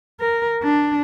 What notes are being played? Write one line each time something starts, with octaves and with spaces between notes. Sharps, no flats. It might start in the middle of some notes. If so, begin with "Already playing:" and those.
A#4
D4